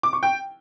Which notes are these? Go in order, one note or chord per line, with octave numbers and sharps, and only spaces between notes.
D6
C#6
G5